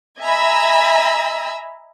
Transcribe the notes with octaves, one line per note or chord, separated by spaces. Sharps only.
D#5 E5 G#5 A#5 B5 E6